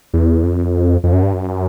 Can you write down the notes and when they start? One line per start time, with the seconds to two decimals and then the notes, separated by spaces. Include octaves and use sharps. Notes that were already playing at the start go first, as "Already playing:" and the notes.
0.14 E2
0.43 F2
1.04 F2
1.13 F#2
1.23 G2
1.33 F#2